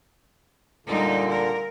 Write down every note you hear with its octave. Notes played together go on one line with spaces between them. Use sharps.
A#2 D3 G3 D#4
A#4